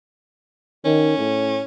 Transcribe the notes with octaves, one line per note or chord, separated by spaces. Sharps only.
D#3 C#4
A2